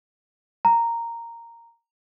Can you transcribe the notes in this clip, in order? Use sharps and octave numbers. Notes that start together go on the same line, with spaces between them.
A#5